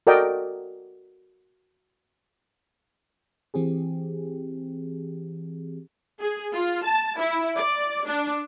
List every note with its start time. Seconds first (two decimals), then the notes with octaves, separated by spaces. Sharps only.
0.07 F#4 A4 A#4 D5 D#5 G5
3.54 E3 C4 G4 G#4
6.18 G#4
6.52 F4
6.83 A5
7.18 E4
7.57 D5
8.07 D4